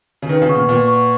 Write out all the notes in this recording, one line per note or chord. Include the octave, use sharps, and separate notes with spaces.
C#3
D#3 B4
C#3
F#5 C#6
A#2
A#2 B4
F#5 C#6